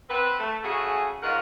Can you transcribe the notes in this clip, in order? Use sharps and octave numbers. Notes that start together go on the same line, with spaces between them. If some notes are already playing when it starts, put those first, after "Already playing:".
C4 B4
A3
C#3 F#3 A3 F#4 G#4
G#2 F4 A#4 C#5 D#5 F#5